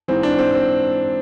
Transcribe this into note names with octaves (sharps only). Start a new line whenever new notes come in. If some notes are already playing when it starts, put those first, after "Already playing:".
G#2 E3 C4
D4
C4
C4